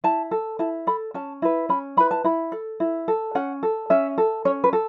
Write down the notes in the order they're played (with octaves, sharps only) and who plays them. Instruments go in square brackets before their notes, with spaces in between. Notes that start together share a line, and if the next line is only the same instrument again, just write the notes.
[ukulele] E4 A5
A4
E4 A5
A4 B5
C#4 A5
E4 B4
C#4 B5
E4 B4 B5
A5
E4 B5
A4
E4
A4
C#4 F#5
A4
C#4 E5
A4
C#4 C#5
B4
A4